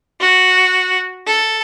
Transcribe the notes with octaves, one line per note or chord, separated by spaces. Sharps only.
F#4
A4